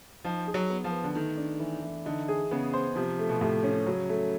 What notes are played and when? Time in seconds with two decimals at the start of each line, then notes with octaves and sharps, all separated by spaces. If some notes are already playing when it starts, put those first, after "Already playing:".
0.24 F3 D#4
0.47 G#4
0.54 F#3
0.70 B3
0.84 F3
0.92 B4
1.04 D3
1.14 D#3 A3
1.37 D4
1.60 E3
1.82 E3
2.06 D3 D#4
2.28 G#4
2.51 C#3 B3
2.74 C5
2.95 C3 F3
3.19 A3
3.29 B2
3.41 A2 C3
3.63 C#4
3.86 C#3 F#3
4.09 A3